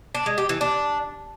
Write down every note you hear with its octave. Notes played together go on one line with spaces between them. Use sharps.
D4
G#3
G4
E3
D4